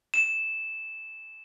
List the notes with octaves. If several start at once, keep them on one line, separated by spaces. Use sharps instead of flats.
E7